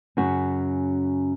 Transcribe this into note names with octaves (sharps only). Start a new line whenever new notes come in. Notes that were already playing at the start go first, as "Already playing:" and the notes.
F#2 C#3 F#4